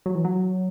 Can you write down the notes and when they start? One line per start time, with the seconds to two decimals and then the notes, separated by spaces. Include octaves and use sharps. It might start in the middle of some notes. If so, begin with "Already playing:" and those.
0.06 F#3
0.15 E3
0.24 F#3